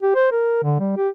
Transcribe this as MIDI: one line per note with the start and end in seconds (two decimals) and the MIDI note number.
0.03 0.13 67
0.15 0.28 72
0.32 0.63 70
0.63 0.75 50
0.79 0.93 55
0.97 1.09 67